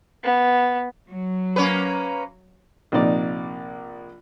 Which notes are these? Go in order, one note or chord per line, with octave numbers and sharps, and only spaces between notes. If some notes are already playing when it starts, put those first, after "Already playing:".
B3
F#3
A#3 C#4 B4
A#1 C3 A#3 D#4 D5